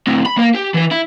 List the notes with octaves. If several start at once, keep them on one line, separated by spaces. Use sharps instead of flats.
A2 C4
B5
A#3 A#4
G4
E3 B4
E4